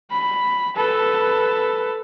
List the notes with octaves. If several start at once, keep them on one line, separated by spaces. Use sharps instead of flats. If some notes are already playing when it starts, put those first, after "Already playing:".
B5
A4 B4